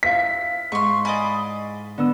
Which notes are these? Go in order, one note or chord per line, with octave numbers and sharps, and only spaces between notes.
E4 F5 B6
G#2 C6 C#6
G#4 D5 D#5 B5
D3 B3 E6